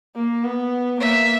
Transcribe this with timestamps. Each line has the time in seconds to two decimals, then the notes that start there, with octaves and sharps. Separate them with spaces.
0.16 A#3
0.44 B3
1.01 A#3 E5